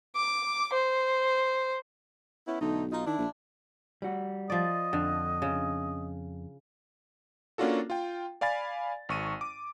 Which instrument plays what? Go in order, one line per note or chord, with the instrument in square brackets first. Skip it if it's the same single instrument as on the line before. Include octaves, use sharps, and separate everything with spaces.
[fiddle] D6
C5
[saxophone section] B3 C#4 E4
[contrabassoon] B1 [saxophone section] D3 A3 D#4
[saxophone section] D#4 F4
[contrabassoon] D#3 [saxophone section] D4 E4
[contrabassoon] A#1
[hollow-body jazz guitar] G3 F#4
[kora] F3 D5 [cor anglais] D#5
[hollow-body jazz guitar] F2 [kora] D3
[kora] C#3
[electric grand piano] A#3 C#4 D4 F4 F#4 A4
F4 G5
D5 F5 G#5 B5 A6
G#1 C#6 D#7
D6